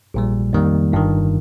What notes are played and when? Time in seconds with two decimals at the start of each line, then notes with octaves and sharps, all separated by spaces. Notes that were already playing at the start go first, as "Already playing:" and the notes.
0.14 A#1 A#2 G3
0.53 F2 D#3 G3 A#3
0.92 G1 G2 D#3